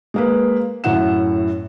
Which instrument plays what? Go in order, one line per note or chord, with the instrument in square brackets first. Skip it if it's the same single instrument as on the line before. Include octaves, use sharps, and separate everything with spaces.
[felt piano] G#3 A#3 B4
F#2 A2 E4 F#5 E7